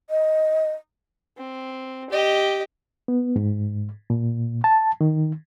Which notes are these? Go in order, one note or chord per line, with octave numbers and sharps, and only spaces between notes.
D#5
C4
G4 D#5
B3
G#2
A#2
A5
D#3